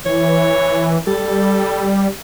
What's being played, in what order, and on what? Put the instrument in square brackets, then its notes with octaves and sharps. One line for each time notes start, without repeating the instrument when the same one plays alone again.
[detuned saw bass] E3 [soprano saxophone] C#5
[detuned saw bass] G3 [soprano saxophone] A4